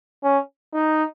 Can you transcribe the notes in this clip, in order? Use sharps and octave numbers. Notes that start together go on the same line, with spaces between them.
C#4
D#4